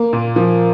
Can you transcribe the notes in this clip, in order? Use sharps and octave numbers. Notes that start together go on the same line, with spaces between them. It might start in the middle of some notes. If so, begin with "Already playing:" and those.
Already playing: A#3
A#2
F3